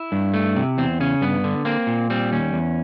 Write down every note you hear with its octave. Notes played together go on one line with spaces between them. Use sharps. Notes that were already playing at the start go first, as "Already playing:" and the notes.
Already playing: E4
G2
A3
C3
E2 C4
C#3 C#4
G2 B3
D3
A#3 C4
A#2
G3 C4
D#2 C#4
E2